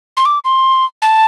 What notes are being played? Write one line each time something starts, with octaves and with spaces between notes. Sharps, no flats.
C6
D6
C6
A5